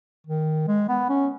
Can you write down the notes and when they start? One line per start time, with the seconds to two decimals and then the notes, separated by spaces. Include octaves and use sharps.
0.27 D#3
0.68 G#3
0.89 B3
1.09 C#4